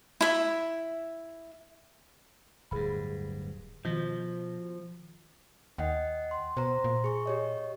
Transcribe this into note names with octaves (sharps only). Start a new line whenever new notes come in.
E4 E5
D1 G2 G#4 B5
B2 D#3 F3
D#2 D#5 F#5 G5
C6
B2 C5 A#5 C6
A#2
G#4 C#6
G4 C#5 D#5